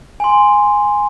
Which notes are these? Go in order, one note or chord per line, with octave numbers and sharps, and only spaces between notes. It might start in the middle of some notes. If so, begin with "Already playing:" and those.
G#5 C6